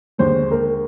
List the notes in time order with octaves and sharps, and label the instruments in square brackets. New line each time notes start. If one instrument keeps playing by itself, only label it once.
[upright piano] D#2 D3 G#3 C5
A#4